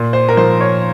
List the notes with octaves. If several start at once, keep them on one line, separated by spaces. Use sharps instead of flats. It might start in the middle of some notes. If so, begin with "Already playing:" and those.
Already playing: A#2
C5
A#4
F3 C5
C#5